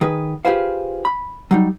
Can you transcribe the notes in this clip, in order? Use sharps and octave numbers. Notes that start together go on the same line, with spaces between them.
D#3 G#4 B4
F4 G4 G#4 B4 C5 F5
B5
F#3 G3 D#4